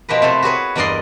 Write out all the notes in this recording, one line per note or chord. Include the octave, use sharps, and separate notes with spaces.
B2 F3 G4 A#4 B4
C3 A3 E4 A4 B4 C5
F#4 G#4 B4 C#5
E2 G2 A#4 D5 D#5 C6